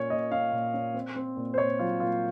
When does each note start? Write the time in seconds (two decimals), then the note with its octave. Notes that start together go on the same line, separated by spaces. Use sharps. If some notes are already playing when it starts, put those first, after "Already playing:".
Already playing: A#2 C#4 C#5
0.10 A#2 D#5
0.32 C#4 F5
0.52 A#2
0.74 C#4
0.94 C4
1.16 C4
1.37 A#2
1.54 C5
1.58 A#2 C#5
1.79 F#3 F4
2.00 A#2 F4